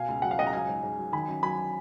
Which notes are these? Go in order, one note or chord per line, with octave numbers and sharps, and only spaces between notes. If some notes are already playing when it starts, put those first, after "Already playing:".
Already playing: B2 F5 G#5
C#2
F#3 F#5
F5
C#2 D#5 F#5
A#5
F#3 F5 G#5
G#2
G#2
F#3
D#3 G#5 B5
F#2
F#3 G#5 B5